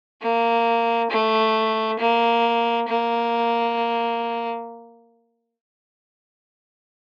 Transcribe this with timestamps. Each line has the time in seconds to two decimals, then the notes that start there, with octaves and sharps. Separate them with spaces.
0.22 A#3
1.10 A3
1.99 A#3
2.88 A#3